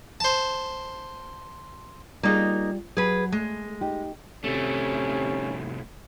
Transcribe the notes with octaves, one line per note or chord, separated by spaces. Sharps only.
C5 A5
G3 A#3 D#4 F4 G#4
F#3 G#4 B4
G#3 A3
D#4 G4
C2 C3 A3 C#4